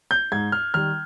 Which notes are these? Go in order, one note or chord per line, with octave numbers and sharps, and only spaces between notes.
G6
G#2 G#6
F6
D#3 G3 F6